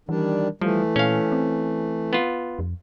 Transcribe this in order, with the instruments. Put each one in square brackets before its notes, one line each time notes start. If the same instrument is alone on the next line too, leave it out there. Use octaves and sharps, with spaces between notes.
[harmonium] D#3 G3 D4 [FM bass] E3
[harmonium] E3 A3 [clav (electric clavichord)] F3 [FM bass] G3
[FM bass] A#2 [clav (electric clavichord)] C#4 F5
[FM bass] C4
[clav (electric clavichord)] B3 F4
[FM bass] F2